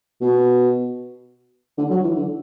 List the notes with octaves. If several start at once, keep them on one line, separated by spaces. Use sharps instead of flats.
B2
D3
F#3
E3
D3